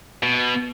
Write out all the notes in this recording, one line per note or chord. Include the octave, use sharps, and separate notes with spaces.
B2